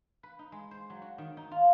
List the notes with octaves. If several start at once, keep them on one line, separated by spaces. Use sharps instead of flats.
B4
D#4
G#3
C5
F#3
F#4
D#3
D#4
F4